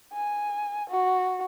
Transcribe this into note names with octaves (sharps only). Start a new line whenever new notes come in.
G#5
F#4